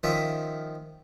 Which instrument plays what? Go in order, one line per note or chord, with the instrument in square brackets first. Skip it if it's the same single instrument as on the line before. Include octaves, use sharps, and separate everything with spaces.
[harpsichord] D#3 F3 C#4 F4 E5